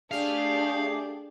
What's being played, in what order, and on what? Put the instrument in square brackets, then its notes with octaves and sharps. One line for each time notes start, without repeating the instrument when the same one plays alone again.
[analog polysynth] A3 G4 G#4 [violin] D4 [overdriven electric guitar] F5